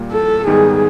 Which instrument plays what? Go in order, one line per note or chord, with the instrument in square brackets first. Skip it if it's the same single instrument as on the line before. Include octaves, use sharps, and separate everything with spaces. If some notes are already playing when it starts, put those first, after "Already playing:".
Already playing: [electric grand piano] A#2 G3 A#3
[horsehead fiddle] A4
[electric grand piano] G#2 D#3 G3 B3 D#4 [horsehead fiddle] G#4